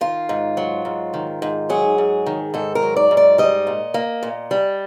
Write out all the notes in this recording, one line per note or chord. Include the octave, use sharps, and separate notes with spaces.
D#3 F4
G#2
F#3
G#2
D#3
G#2
F#3 G#4
G#2
D#3
G#2 A4
A#4
F#3
D5
G#2
D5
G3 D#5
A#2
A#3
A#2
G3